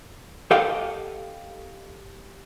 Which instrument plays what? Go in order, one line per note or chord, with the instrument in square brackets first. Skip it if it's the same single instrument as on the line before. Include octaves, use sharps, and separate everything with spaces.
[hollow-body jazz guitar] G4 A4 D#5 F5 G5